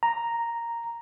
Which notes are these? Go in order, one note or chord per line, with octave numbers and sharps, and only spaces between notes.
A#5